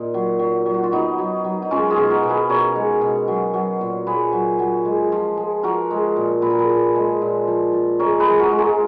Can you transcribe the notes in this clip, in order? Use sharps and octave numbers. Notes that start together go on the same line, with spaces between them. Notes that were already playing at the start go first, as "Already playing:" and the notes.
Already playing: A#2 A#3 D#4
F#3
F#3
F#3
F#4
F4
F#3 B3 D#4
F#3
F#3
D#4
G#3 C#4 F4
F4 G#4
B2
F#4 A#4
B2
G#4 B4
B2 A#4 C#5
G#3
B2
F#3
F#3
A#2
A#2 G#4 B4
F#3
F#3
G#3
F3
G#3
F3 F#4 A#4
G#3
A#2
A#2 B4
A#4
G#4 B4
F3
G#3
A#2
F3
F3
G#3 A#4 C#5
G#4 B4
G#3
F#4 A#4
G#3
F4 G#4